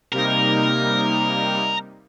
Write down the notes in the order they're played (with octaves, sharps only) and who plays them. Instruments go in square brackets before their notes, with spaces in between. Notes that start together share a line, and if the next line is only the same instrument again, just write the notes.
[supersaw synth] C3 G3 A#3 D#4 [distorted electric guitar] A#4